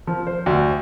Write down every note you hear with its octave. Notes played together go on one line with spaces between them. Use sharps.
F3
C5
D2